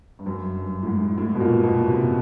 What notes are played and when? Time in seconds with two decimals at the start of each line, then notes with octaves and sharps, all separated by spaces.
0.19 G2
0.26 F#2
0.57 G2
0.83 A2
0.87 G#2
1.18 A2
1.35 B2
1.40 A#2
1.63 B2
1.86 C3